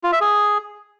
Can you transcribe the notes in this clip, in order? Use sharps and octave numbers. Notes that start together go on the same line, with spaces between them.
F4
E5
G#4